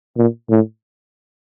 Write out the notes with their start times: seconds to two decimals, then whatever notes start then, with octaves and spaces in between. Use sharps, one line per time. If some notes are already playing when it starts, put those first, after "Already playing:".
0.17 A#2
0.50 A2